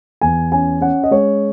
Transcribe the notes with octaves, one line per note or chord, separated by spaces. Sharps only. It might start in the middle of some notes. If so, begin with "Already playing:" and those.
E2 G#5
C#4 G#5
C#4 F#5
D#5
G#3 C#5